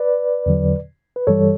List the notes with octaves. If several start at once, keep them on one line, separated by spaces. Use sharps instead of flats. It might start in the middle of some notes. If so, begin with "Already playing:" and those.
Already playing: B4 D5
E2 D3 F#3
B4
G2 E3 G3 A4 C#5